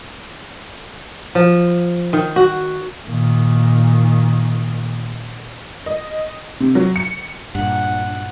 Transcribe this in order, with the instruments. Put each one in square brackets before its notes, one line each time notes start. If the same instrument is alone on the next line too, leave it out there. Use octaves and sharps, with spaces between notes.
[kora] F3
D#3
F#4
[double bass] A#2 D#3
[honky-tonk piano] D#5
C3
F#3
C#7
[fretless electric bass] G2 A#2 [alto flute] D4 [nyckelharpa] F#5